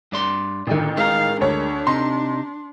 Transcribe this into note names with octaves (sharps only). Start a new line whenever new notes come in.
G2 D5 C6
A1 A#2 D3 D#3
G#3 A#4 F5
D2 D4 C#5
C3 D#4 C6